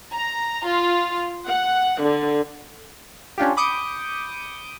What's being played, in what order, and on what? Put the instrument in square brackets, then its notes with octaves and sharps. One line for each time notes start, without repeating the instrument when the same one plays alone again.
[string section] A#5
F4
F#5
D3
[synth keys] C#4 D4 F4 G4
B5 D6 D#6 G6 C#7